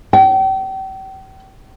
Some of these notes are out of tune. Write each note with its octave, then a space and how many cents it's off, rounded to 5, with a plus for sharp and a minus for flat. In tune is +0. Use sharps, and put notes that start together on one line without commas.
G5 -35